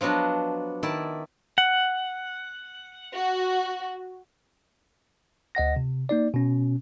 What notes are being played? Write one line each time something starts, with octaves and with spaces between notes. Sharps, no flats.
F3 F#3 B3 D4 D#5
D#3 E4 D5 A5
F#5
F#4
D2 D#5 F#5 A#6
C3
A#3 D#4 D5
B2 C#4